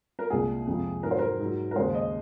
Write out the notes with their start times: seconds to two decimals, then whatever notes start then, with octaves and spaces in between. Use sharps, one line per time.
0.19 A#4
0.30 C2 A#2 G#3 G#4
0.67 F2 C3 F3 G#3
1.03 G#2 A#4
1.08 F#3 C5
1.19 A#4
1.40 G#2 F#3
1.71 A#4
1.76 D#2 C#3 G#3 C5
1.94 D#5